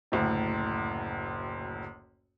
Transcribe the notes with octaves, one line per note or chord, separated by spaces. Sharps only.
F#1 D2 A2